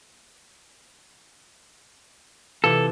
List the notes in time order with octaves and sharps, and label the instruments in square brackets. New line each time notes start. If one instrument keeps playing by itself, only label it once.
[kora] C3 E3 F4 [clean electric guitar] A4